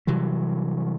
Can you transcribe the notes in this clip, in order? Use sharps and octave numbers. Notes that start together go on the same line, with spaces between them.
C3 E3 F#3 G3